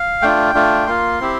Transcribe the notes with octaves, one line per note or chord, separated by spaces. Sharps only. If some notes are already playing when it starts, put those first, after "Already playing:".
Already playing: F5
A3 D4 F4 G5
A3 D4 F4
A#3 F4 C6
C4 E4 G4